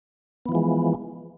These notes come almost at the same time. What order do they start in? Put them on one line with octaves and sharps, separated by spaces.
B3 E3 F3 G#3